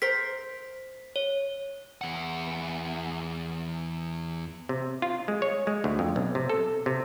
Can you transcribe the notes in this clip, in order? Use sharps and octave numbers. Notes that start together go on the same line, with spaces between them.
A#4 C5 B6
C#5
E2 F#5
C3
F4
G#3
C#5
G#3
D2
F2
B1
C3
A4
C3